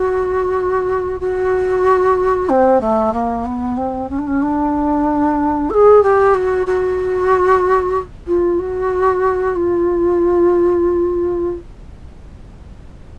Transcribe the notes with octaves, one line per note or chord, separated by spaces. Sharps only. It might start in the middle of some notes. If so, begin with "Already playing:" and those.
Already playing: F#4
F#4
C4
A3
A#3
B3
C4
C#4
D4
C#4
D4
A4
G#4
G4
F#4
F#4
F4
F#4
F4